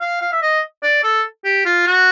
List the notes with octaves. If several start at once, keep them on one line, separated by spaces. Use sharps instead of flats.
F5
F5
E5
D#5
D5
A4
G4
F4
F#4